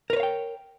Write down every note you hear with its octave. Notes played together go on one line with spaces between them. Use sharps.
A#4 B4 C#5 F5 G5